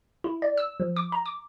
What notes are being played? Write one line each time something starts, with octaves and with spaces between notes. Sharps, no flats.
E4
D5
E6
F3
D6
A#5
D6